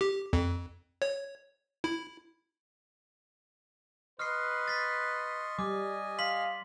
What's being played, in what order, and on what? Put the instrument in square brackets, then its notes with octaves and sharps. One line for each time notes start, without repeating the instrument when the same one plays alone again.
[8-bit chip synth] G4
F2
C#5
E4
[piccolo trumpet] B4 [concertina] D#5 C6 C#6 [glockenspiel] F6 C7
[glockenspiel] A6 B6
[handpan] G3 [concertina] D#5 G#5 [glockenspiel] D6
[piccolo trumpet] F5 [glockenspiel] C6 B6 F#7